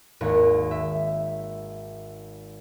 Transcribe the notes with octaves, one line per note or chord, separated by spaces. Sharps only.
G#1 D#2
E5